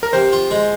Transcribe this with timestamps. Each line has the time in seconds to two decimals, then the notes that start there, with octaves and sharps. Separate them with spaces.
0.03 A#4
0.13 C3 C5
0.32 F4
0.51 G#3